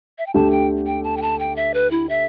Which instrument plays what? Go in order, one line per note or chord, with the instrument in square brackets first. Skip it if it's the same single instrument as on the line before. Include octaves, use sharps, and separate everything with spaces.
[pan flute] E5
G5
[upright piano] D2 D3 A3 G4 [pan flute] A5
[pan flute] G5
G5
A5
G5
A5
G5
E5
B4
E4
E5